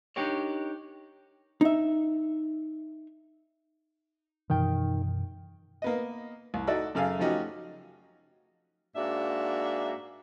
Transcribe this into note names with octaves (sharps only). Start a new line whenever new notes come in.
D4 D#4 G4 A#4 C#5
D#4 E5
F#2 B2 D#3 E3 G5
A#3 B3 D#5
C2
D#4 F#4 A4 D5 E5
F#2 C#3 A4 F5 G#5
F3 A3 C#4 D#4 F#4 G4
G#2 A#3 D4 F#4 E5